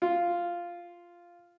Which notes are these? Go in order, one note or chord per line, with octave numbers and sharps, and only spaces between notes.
F4